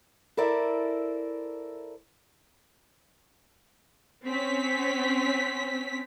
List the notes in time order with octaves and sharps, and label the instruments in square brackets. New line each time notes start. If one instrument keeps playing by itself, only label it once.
[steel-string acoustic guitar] E4 A4 A#4 C5 D5 E5
[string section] C4 C#4 B6